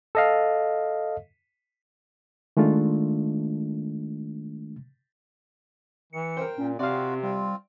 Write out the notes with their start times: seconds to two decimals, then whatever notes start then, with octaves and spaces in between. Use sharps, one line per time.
0.15 A4 D#5 F5
2.57 D#3 G#3 A3 D4 F4
6.13 E3 C#7
6.37 A#4 C5 G5
6.58 A#2 C#4
6.79 C3 C4 F4 F#4 D5 F5
7.23 G3 C4 F4